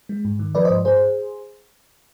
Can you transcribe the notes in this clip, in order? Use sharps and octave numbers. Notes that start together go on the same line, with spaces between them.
G#3
G#2
D#3
F3 B4 D5
C5 D#5
G#2
G#2 G#4 C5